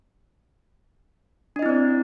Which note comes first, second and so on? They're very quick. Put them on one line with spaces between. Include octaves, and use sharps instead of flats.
D4 D#5 E4 C4 D5